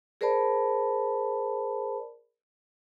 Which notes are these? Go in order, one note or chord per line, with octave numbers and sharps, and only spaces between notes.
G#4 A#4 C5 D5 A5 B5